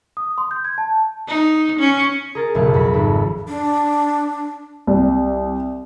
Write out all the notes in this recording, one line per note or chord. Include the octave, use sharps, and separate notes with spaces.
D#6
C6
G6
G#6
A5
D#4
C#4
G#4 A#4 A6
F#1 B1 A3 C#7
F2 B5 B6
G#1 A4
D4
C2